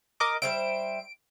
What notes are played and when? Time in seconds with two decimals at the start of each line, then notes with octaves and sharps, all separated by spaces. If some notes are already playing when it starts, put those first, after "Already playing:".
0.20 A#4 D#5 D6
0.42 G3 C5 E5 D7